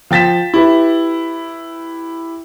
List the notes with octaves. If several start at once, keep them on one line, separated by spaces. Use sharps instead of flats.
F3 G5 A6 B6 E7
E4 G4 B4